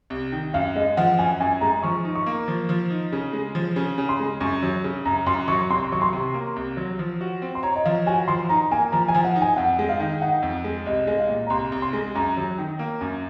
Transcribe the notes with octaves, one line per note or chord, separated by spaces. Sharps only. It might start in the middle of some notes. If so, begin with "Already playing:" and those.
C2
D#3
F#2 F5
G#3 D#5
F3 F#5
F#2 G#5
F#2 G#5
G#3 A#5
F3 C#6
D#4
C#6
A#3
F3
F3
D#4
C#3
G#3
F3
C#3
C#3
C6
G#3
F#2 C#6
F#3
C#3
F#2 A#5
F#2 C6
F#3 C#6
C2 C6
F#3 C#6
C6
C3
A#3
C2
F#3
F3
F#4
C4
C6
C#5 A#5
D#5
F3 F5
F#4 G#5
F3 C6
D#4 A#5
A#3 G#5
F3 A#5
G#5
F3
F#5
D#4
G#5
F2 F#5
G#3
F5
D#3
D#4 F#5
F2
G#3
C2 D#5
G#3 D#5
F5
A#2
A#5
C2 C6
C2
C6
G#3
F#2 A#5
F#3
D#3
A#3
F#2